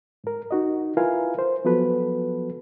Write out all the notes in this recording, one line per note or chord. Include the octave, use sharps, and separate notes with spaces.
G#2 A#4
D#4 F#4 D#5
E4 F4 A#4 B4 F5 G#5
C5
F3 F#3 B3 F#4 A4 B4